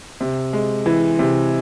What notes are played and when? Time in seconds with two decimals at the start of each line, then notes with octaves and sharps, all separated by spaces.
0.21 C3
0.53 G#3
0.86 E3
1.19 C3